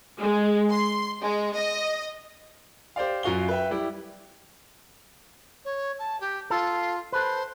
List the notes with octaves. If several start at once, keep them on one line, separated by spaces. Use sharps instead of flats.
G#3
C6
G#3
D#5
G4 C5 D5 F5
F#2 F4 F#4 F5 G7
B4 E5 G5
G3 E4 G4
C#5
A5
G4
F4 A4
A4 B4 C5